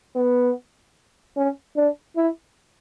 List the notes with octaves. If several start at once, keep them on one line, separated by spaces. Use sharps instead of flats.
B3
C#4
D4
E4